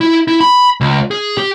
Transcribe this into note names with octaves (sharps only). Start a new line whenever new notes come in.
E4
E4
B5
C#2
G#4
G4